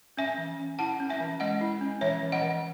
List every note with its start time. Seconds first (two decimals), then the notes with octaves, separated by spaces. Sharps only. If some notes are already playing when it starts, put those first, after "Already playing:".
0.17 C#4 E5 G#5
0.38 E3
0.59 C#4
0.79 E4 F#5 A5
1.00 C#4
1.09 E5 G#5
1.20 E3
1.40 G#3 D#5 F#5
1.61 E4
1.81 C#4
2.01 E3 C#5 E5
2.22 E3
2.32 D#5 F#5
2.42 E3